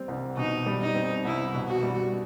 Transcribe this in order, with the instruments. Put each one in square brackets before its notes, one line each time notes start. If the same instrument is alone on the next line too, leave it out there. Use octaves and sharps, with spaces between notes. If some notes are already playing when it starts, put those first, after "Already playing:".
Already playing: [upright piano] G3 C4
C2
[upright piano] B2 [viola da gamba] D#4
[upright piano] G3
[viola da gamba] D#4
[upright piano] C4
[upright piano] C2 [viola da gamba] E4
[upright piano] B2
[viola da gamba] F#4
[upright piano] G3